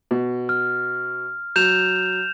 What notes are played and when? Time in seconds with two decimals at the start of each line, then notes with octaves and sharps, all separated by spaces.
0.11 B2
0.49 F6
1.56 F#3 G6 E7 F7